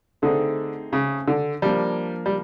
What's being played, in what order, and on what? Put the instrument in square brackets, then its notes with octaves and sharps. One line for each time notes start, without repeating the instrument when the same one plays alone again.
[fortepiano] D3 [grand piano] A3 C4 D#4 G#4
[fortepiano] C#3
D3
[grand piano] F3 A#3 D4 [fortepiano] G3
[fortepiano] G3